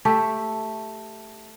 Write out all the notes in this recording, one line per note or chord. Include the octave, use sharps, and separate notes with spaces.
A3 G4 A4 E5